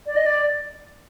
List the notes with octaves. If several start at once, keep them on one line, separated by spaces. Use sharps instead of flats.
D5
D#5
D5